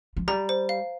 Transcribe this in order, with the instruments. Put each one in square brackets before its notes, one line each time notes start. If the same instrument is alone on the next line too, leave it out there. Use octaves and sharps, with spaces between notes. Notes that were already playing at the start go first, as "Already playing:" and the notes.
[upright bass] F3
[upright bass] G3 [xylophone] A#5
[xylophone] C5
F5